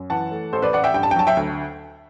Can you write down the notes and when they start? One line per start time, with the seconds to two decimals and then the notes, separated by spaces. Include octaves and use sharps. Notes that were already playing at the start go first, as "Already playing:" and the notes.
Already playing: F#2
0.10 E3 F#5 A5
0.32 A3
0.53 A1 A4 C5
0.62 B4 D5
0.73 A1 D5 F#5
0.84 E5 G5
0.94 G2 G5
1.03 A5
1.11 G5
1.16 F#3 A5
1.27 E5 G5
1.37 D2